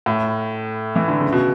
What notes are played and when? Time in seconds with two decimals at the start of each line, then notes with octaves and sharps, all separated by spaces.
0.06 A2
0.96 E3
1.08 D3
1.20 C#3
1.32 B2